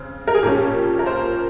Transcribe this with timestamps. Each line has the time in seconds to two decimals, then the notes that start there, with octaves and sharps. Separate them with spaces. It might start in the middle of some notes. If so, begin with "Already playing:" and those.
Already playing: C#3 C4
0.28 A#4
0.35 G#4
0.43 A#2 F3 A#3 C#4 G4
0.99 A#4
1.06 C5